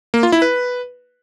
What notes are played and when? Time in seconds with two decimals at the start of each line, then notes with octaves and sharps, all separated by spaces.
0.14 A#3
0.23 F4
0.32 E4
0.42 B4